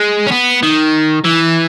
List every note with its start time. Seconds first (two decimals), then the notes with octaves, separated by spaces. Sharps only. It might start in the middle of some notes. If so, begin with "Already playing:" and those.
Already playing: G#3
0.27 C#4
0.32 B3
0.63 D#3
1.25 E3